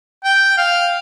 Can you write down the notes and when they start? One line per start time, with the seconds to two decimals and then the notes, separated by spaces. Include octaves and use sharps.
0.24 G5
0.57 F5